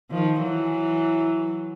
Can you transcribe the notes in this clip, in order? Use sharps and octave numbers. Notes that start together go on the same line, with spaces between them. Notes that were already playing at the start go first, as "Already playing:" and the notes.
D#3 F3
E3 F#3